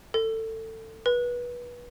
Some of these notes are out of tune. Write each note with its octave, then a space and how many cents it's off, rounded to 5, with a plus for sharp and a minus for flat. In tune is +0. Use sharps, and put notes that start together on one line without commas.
A4 +25
B4 -25